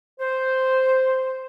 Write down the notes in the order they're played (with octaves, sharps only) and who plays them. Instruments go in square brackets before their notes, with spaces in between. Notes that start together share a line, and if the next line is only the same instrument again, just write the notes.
[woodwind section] C5